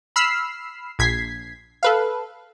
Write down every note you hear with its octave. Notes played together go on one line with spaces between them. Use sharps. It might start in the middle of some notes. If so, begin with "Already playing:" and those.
B5 E6 F6 C7
A#1 G#6 B6 C7
A4 B4 F5